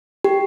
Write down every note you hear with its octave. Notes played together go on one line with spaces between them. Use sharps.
G4